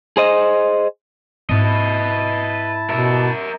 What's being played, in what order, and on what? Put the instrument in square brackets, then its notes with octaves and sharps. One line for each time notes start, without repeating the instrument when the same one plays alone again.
[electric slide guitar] G#4 C5 D#5
[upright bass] G#2 C4 [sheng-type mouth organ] E4 A5 [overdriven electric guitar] B4 D#5
[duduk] B2 [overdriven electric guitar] A#4 E5